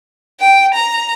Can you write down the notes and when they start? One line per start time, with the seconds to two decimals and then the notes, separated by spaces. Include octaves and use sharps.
0.40 G5
0.74 A#5